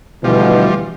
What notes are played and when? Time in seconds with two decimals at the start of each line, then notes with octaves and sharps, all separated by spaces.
0.24 D2 B2 E3 F3 G3